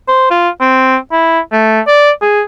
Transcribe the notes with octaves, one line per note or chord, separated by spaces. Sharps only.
C5
F4
C4
E4
A3
D5
G#4